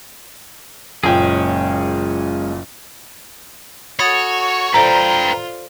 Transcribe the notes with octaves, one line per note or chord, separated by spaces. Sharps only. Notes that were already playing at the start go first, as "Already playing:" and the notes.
F#1 A#2 G#3 C#4 G#4 G5
F#4 A4 C#5 B5 D#6 A6
F4 A4 B4 C5 D5 G5 A#5